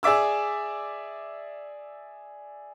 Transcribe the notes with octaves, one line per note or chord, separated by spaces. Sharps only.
G#4 D5 E5 D6 E6